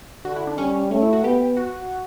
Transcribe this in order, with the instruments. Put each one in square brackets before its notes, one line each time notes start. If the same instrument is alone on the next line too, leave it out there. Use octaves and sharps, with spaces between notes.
[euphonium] D3 [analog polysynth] F#4
[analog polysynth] E4
D4
[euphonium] G3 [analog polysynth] C#4
[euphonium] A3 [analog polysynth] C#4
[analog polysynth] E4
F#4
[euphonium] B3 [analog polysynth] G4
[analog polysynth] F#4